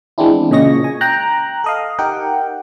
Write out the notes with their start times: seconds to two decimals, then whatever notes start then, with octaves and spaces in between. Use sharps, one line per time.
0.18 E3 G#3 B3 C4 D4 E4
0.51 A#2 C#3 G#3 D#5 C#6 A#6
0.84 G#5
1.01 G5 A#5 F#6
1.64 A4 D#5 F5
1.99 D#4 G4 A#4 F#5 G5